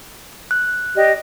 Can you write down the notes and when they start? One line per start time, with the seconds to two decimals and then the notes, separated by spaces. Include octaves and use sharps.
0.51 F#6
0.95 G4 D5 D#5